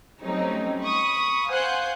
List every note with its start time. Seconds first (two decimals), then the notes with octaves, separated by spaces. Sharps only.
0.22 F#3 G3 A3 C4 C#4 D#4
0.82 B5 C#6 D#6
1.49 C5 F5 F#5 G#5 F#6 G6